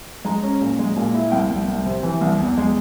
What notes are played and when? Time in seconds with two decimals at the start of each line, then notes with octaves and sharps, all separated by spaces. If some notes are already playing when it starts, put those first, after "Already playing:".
0.25 G#3 A#5
0.43 C#4
0.61 A#2
0.79 G#3
0.97 A#2
1.14 E4
1.32 C2 G5
1.51 C2
1.68 C2
1.86 C3
2.03 E3
2.21 C2
2.39 E2
2.58 G#3